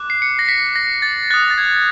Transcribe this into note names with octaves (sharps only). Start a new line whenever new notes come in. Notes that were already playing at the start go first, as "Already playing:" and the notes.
Already playing: D6 F#6
C7
C#7
A#6
B6
A#6
A6
D#6 F#6 A6
A6
G#6